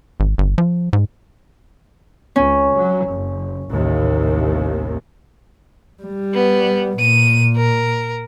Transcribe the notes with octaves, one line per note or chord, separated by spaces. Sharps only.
G#1
G1
F3
G#2
C#2 C#4
F#3
F#1
A1 D#2 C3
G3
B3
A#2 D#7
A#4